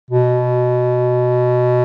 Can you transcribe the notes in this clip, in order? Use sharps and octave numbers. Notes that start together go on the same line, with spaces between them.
B2